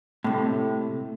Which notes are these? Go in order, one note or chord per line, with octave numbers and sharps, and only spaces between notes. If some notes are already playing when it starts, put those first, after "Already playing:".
A2 C3